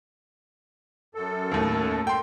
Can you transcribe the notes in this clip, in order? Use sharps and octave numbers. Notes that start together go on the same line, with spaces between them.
F#2 A4
D#2 A2
G5 C6